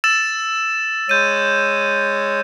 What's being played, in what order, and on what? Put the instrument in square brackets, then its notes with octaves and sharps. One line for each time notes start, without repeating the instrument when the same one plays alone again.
[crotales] E6 A6 E7
[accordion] G#3 C#5 [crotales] G6 D#7